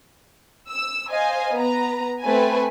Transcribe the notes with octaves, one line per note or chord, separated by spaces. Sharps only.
E6
C5 D#5 F5 G#5
B3 B4 A#5
A3 C4 B4 G#5